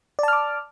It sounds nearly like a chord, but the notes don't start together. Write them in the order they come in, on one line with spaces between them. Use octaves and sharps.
D5 A5 F6 D6